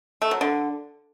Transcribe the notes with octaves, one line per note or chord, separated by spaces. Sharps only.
A3
F#3
D3